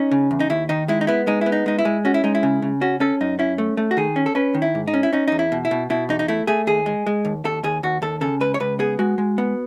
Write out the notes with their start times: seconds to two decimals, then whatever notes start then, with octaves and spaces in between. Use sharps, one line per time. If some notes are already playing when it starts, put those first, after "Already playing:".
Already playing: C#4 D#4
0.11 C#3
0.31 E2
0.40 D#4
0.50 D#2 E4
0.69 D#3 D#4
0.88 G#3 E4
1.01 D#4
1.07 B3 E4
1.27 G#3 D#4
1.41 B3 E4
1.52 D#4
1.66 G#3 D#4
1.79 E4
1.85 G#3
2.05 C#4 F#4
2.14 E4
2.24 G#3 D#4
2.35 E4
2.43 C#3
2.62 C#3
2.81 C#4 F#4
3.00 C#4 A4
3.21 F#2 D#4
3.39 C#4 E4
3.58 A3
3.77 A3
3.91 F#4
3.97 D#3 G#4
4.16 C#4
4.26 A4
4.35 C#4 B4
4.55 D#3
4.62 E4
4.75 G#2
4.87 D#4
4.94 C#4
5.03 E4
5.13 C#4 D#4
5.28 E2 D#4
5.39 E4
5.52 B2
5.65 E4
5.71 B2
5.90 B2 E4
6.09 E2 D#4
6.19 D#4
6.28 A3 E4
6.47 A3 G#4
6.67 D#2 G#4
6.86 G#3
7.06 G#3
7.25 D#2
7.45 D#2 A4
7.64 D#2 G#4
7.83 D#2 F#4
8.02 D#2 A4
8.21 C#3 A4
8.41 C#2 B4
8.54 C#5
8.60 C#2 B4
8.79 B3 G#4
8.99 G#3 F#4
9.18 G#3
9.38 B3